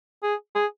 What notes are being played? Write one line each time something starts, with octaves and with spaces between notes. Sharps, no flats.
G#4
G#4